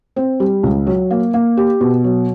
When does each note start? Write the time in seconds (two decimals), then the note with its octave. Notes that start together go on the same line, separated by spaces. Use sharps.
0.16 C4
0.40 G3
0.63 C#2
0.87 F#3
1.11 A#3
1.34 A#3
1.57 G4
1.81 B2
2.04 F#3